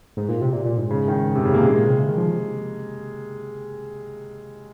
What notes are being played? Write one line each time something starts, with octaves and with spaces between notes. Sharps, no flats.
G#2
A#2
C3
A#2
A#2
G#2
C#3
D#3
C3
C#3
A#3
A#2 G#3
A#2
C3
C#3
D#3
F3